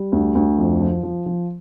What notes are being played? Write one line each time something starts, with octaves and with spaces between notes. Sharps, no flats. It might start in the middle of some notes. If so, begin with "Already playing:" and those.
Already playing: G3
D2
D2
F2
F3
F3
F3